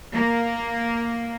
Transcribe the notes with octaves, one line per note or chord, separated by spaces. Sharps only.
A#3